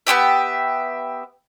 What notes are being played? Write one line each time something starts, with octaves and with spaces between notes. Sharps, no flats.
B3 C#4 G4 E5